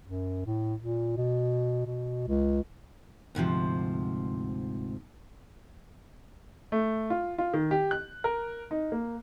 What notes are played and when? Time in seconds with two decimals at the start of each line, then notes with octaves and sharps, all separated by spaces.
0.05 F#2
0.46 A2
0.80 A#2
1.17 B2
1.86 B2
2.28 C#2
3.35 D2 G#2 C3 F3
6.72 A3
7.10 F4
7.38 F4
7.54 D#3
7.71 G4
7.91 F#6
8.24 A#4
8.71 D#4
8.92 A#3